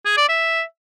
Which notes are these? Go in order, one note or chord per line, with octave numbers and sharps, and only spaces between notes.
G#4
D5
E5